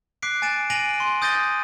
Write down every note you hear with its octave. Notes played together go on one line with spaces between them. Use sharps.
D6 F#6 B6 C7 D7
G#5 A6 D7 E7
G#5 A#6 D7 D#7 F7 F#7
C6
D#6 G6 A6 A#6 D#7 G7